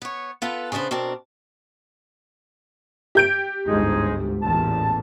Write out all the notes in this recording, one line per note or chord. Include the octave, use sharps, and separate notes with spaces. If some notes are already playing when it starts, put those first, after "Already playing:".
B3 C#5
B3 F4 A4 B4
C#3 B3 D4 B4 C5
B2 C4 D4 A#4 A5
G4 G6 D7
G1 D2 G#2 G#3 D#4 G#4
A1 E2 A#2 A5